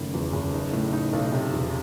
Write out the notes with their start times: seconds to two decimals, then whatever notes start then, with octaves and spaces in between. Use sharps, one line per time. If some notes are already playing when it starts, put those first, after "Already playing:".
Already playing: F#1 D#3 A3
0.14 E2
0.33 F#1
0.53 D#4
0.73 A2
0.93 D#4
1.13 B1
1.32 C3
1.52 E2